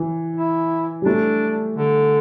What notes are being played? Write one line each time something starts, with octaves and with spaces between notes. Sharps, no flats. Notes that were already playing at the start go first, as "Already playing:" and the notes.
Already playing: E3
E4
G3
A3 D4
D3